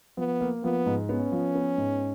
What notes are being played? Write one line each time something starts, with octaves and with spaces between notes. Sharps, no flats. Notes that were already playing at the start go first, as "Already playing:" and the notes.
F3 B3
A#3
F3 B3
G#2
B3 C#4
F3
B3
G#2